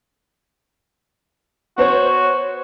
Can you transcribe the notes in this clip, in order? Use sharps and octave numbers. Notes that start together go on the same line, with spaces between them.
B3 F#4 C5 C#5